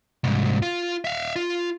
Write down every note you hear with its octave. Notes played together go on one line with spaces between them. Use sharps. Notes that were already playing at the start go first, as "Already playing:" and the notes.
C2 G#2
F4
E5 F5
F4